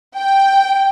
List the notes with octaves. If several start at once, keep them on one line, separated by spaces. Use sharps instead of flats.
G5